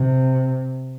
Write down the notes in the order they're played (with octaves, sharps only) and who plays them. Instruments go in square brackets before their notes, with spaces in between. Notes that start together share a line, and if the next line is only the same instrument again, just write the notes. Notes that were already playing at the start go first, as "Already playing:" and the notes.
Already playing: [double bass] C3